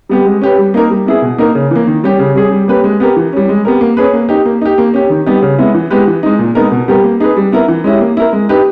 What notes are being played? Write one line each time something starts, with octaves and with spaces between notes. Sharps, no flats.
G3 B3 G4
G#3
C#4 G4 B4
G3
A#3 D#4 A#4
G3
B3 E4 G#4
B2
A#3 D#4 A#4
C#3
E3 A#3
D#3
G3 C#4 G4
C#3
G3 C#4 G#4
G3
A#3 C#4 G4 B4
G#3
B3 G4 A#4
E3
G3 C#4
G#3
B3 G4 A#4
A#3
C#4 G#4 B4
A#3
D#4 G4
A#3
D#4 G4
A#3
C#4 G4
D#3
G3 B3 D#4 G4
C#3
G#3 B3 E4
E3
G#3 B3 G4 B4
E3
G#3 D#4
A#2
G#3 B3 D#4 A#4
B2
G3 B3 G4 A#4
A#3
D#4 G#4 B4
G3
B3 E4 A#4
E3
G#3 C#4 E4 G4
A#3
E4 A#4
G#3
D#4 G4 B4